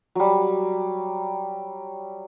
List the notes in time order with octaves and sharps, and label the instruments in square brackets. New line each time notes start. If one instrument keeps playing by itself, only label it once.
[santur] F#3 G3